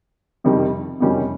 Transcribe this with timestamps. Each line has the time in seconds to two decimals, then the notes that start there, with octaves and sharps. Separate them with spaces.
0.44 F2 C3 D#3 G3
1.00 F2 C3 D#3 G3 C#4